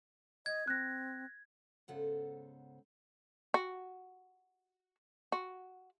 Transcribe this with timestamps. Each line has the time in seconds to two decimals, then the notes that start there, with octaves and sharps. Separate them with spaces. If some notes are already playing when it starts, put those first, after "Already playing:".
0.46 D#5 G#6
0.68 C4 F#6 A#6
1.88 G#2 C#3 B3 A4 C5 F#5
3.54 F#4
5.32 F#4